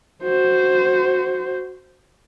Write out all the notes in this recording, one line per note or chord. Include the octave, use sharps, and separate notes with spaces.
F#4 C5